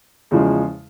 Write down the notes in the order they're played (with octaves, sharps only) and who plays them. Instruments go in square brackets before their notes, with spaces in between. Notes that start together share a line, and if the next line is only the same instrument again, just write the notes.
[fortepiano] E2 C#3 F3 G#3